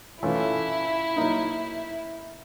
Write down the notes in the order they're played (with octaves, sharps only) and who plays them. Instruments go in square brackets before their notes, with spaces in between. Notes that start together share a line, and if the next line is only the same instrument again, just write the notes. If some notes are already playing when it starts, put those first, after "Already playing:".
[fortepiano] E3 A3 C#4 F4 [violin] E4
[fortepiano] F#3 A#3 D#4